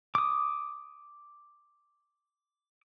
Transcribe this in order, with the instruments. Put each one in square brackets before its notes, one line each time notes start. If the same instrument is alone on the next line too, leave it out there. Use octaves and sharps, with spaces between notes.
[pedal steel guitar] D6 D#6